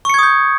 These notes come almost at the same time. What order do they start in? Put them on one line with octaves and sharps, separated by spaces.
C#6 C#7 G#6 D#6 G6